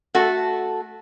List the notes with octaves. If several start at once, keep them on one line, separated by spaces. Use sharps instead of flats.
A3 F#4 A4